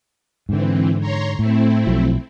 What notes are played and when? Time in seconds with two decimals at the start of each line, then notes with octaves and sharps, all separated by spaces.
0.49 G#2 D3 E3 C4
1.00 C#5 A#5 C6
1.39 A2 A3 C4 E4
1.87 B1 F3 F#3